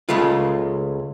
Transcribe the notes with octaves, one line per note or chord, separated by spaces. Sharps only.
C#2 C#3 G#3 A3 F4